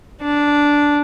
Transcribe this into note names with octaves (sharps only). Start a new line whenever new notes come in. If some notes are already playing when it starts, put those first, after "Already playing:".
D4